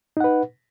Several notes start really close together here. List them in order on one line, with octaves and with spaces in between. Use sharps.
D#4 F#5 B4